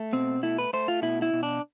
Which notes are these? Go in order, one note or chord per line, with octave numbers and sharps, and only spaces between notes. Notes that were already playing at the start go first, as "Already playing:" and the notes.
Already playing: A3
B2 C4
A3 E4
B4
A3 C5
F4
B2 E4
E4
B2
D4